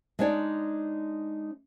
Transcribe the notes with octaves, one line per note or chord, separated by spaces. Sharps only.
G#3 D4 D#4 C#5 D5